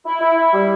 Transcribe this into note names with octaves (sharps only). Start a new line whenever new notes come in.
E4
E4
E4
G3